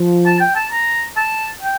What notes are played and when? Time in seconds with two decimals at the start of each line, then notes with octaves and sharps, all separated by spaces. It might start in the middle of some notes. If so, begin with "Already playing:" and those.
Already playing: F3
0.26 A5
0.40 G5
0.56 A5
0.72 A#5
1.17 A5
1.62 G5